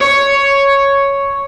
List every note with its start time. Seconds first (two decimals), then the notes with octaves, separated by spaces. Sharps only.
0.01 C#5